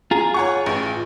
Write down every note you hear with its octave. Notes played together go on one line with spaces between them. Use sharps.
F4 G#4 A#5
C#5 F#5 C#6
A1